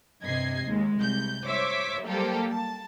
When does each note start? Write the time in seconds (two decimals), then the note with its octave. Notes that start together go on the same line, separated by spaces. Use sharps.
0.23 G2 C3 D#5 G#6 C7
0.67 D#2 G#3
0.99 C2 G6
1.46 C5 C#5 E5 D6 B6
2.04 F#3 G3 A#3 G4 A4 C5
2.49 A5